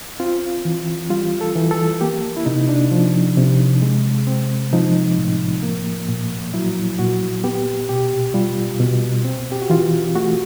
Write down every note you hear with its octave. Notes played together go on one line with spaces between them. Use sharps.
C4 F4
E3
G3 F4
A4
E3
A4
A#3 G4
E4
C3 D#4
D4
F3
C3
G#3
C4
F3 D#4
A2
A#3
A#2
F#3 E4
A#2 F#4
B3 G4
B2 G4
G3 F4
B2
C4
G4
F#4
E3 F4
A3 F#4